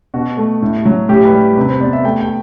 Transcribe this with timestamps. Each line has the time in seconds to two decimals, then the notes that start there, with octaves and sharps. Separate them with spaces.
0.14 B2 F#4
0.37 A3
0.62 A2
0.85 F#3
1.09 A2 G4
1.25 B4
1.33 G3
1.57 C3 B4
1.69 C5
1.81 B3 D5
1.93 E5
2.04 A3 G5
2.21 G5